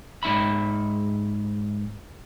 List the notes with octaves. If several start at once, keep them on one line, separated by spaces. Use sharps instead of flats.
G#2 D#4 E5 B5